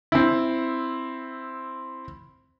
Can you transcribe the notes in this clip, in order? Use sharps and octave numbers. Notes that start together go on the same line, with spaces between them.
C4 E4